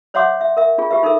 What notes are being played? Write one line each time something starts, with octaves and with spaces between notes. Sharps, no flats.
C5 C#5 E5 F#5 C6 D6
E5
A#4 E5
D4 F4 G#4
F4 G4 B4 E5
D#4 A4 A#4 E5